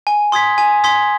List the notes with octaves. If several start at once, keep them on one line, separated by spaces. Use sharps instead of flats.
G#5
C6 D#6 G#6 B6
G#5
C6 D#6 G#6 B6